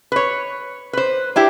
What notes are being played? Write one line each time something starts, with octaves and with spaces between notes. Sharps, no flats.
B4 C#5
B4 C5
D4 E4 G4